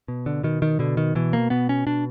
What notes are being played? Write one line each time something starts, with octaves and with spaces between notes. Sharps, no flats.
B2
D3
B2 D#3
D#3
B2 D3
D#3
B2 E3
A#3
B2 B3
C#4
B2 D4